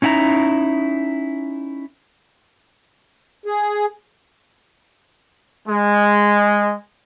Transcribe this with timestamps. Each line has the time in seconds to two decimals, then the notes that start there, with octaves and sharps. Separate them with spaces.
0.02 C#4 D#4 E4 F#5 A#5
3.46 G#4
5.67 G#3